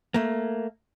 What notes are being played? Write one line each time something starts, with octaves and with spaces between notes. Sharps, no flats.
A3 A#3